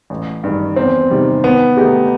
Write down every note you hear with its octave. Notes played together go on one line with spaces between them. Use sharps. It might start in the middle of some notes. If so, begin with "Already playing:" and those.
A1
G2 D#3
E2 C4
C3 D#3 G3
D#2 B3
D#3 A3 D#4 G4